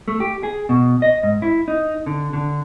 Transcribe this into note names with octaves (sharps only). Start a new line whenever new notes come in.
A3
G4
G#4
B2
D#5
G#2
E4
D#4
D3
D3